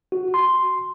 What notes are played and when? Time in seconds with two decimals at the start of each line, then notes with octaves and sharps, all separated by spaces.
0.12 F#4
0.34 C6